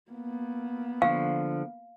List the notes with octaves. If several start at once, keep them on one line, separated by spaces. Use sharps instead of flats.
A#3 B3
D3 F3 F5 C#6